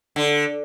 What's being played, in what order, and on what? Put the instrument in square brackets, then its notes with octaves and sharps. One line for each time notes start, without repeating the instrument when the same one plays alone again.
[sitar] D3